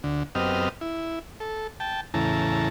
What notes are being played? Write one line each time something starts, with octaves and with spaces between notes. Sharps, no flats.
D2 D3
F#2 B3 C4 G4 D#5 F6
E4
A4
G5 A5
E2 A2 C#3 E3 A5 A#5